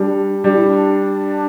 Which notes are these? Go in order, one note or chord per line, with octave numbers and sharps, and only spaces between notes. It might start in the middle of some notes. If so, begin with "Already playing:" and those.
Already playing: G3 D4
G3 D4
E4
D4